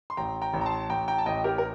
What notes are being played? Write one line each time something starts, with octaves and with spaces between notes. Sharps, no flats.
C6
A1 G5 A#5
G5 A#5
A1
A#5
A5 C6
A1 G5 A#5
G5 A#5
A5
A1 D#5 G5
G4 A#4
A#4